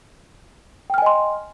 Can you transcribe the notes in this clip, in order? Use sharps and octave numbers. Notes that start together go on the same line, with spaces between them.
D#5 G5 G#5 C6 F6